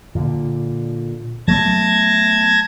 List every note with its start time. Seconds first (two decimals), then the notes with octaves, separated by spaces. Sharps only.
0.15 A#2 D3
1.48 F#3 A3 B3 A5 G#6 A#6